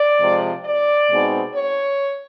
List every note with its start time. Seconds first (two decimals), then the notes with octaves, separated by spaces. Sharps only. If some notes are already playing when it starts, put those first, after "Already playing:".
Already playing: D5
0.21 C3 F3 G#3
0.65 D5
1.10 B2 G#3 C4 D#4
1.55 C#5